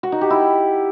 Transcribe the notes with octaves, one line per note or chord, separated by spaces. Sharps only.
F#4
D#4
G4
E4